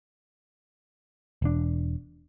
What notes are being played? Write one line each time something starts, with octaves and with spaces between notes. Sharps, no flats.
E1 D4